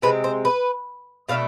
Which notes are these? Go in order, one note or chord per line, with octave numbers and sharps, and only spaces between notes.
C3 G#3 C4 B4
C5
B4
B2 A3 D4 F5